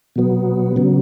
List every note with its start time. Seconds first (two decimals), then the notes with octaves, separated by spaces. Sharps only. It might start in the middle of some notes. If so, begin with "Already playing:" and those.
0.16 B2 F#3 B3
0.76 C#3 F#3